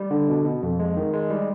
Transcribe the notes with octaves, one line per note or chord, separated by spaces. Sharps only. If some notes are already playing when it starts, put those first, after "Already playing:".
Already playing: G3
D3
B2
B2
F2
G#3
D#3
G#3
G3